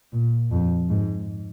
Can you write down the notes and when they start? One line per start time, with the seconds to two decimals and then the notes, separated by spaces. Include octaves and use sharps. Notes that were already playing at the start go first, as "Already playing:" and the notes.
0.13 A#2
0.51 F2
0.89 G#2